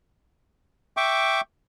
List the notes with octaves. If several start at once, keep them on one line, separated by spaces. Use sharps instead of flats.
E5 G5 C#6 D6